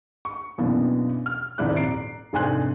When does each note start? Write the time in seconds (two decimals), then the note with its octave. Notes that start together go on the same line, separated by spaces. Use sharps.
0.25 C#6
0.58 F#2 B2 E3 A#3 B3 D4
1.26 F6
1.58 D#1 F2 G#2 E4 D5 F#6
1.76 A#5 C7 D7
2.33 F1 G#2 D4 G#5 C6 F#6